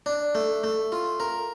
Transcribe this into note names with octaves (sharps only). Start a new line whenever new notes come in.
D4
A3
A3
F4
A#4